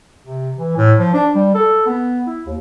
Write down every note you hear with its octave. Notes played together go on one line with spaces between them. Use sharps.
C3
E3
A2
F3
D4
G3
A4
B3
E4
D#2